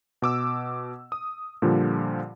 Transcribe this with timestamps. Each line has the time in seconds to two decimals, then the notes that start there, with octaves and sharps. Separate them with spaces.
0.22 B2 D6 E6
1.12 D#6
1.62 A#2 D3 F3 G3